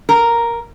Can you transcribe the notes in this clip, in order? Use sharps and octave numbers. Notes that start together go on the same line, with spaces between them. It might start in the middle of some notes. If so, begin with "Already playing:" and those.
A#4